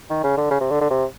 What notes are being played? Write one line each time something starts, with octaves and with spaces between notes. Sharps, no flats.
D#3
C#3
D3
C#3
C3
D3
D3
C3